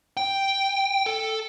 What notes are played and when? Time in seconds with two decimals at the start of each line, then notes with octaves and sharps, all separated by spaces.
0.17 G5
1.06 A4